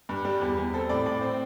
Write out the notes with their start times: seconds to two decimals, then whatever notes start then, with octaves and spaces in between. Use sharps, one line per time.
0.09 G2
0.25 G3
0.41 E2
0.57 E2
0.74 C4 A4
0.89 A2 D5
1.06 A2 D5
1.21 C4